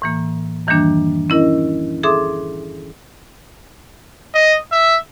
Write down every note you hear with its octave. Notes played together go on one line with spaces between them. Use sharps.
A2 E3 A#3
F#2 D#3 E3 G3 A#3 D4
C#4 E4 A#4 D#5
G#4 A4 E5 C6 D6 D#6
D#5
E5